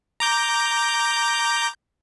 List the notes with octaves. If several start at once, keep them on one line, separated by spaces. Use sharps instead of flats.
A#5 D6 G6